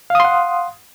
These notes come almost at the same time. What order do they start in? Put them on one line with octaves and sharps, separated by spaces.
F5 D#6 C6 F#5